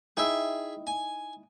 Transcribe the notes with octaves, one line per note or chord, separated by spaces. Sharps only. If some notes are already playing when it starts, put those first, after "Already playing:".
D#4 E4 G#4 E5 G5
G#5